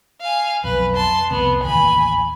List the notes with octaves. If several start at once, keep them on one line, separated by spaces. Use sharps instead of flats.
F5 G#5
B1 F2 B4
A5 C6
C2 F2 C3 B3
A1 D#2 G#5 B5